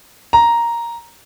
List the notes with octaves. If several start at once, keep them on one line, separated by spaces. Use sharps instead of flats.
A#5